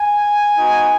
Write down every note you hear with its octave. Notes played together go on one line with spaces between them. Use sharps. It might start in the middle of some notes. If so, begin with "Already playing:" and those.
Already playing: G#5
B3 D#4 F#4